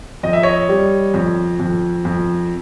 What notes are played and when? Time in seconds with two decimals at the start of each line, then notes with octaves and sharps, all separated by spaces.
0.23 F2 D#5
0.33 E5
0.43 C#5 D#5
0.69 G3
1.14 F2
1.60 F2
2.05 F2